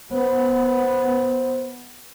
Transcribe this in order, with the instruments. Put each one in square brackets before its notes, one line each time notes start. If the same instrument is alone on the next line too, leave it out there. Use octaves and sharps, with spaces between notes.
[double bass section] B3 [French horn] C5